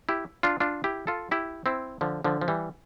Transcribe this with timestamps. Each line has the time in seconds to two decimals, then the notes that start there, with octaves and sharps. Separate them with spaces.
0.09 E4 G4
0.43 D4 F4
0.60 D4 F4
0.84 E4 G4
1.07 F4 A4
1.31 E4 G4
1.66 C4 E4
2.01 D3 F3
2.24 D3 F3
2.41 F3
2.48 E3 G3